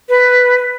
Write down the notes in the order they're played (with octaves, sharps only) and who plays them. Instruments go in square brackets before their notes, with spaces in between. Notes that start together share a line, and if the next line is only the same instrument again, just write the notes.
[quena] B4